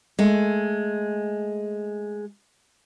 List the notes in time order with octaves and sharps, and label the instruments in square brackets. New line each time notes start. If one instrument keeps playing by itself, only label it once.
[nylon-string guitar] G#3 A3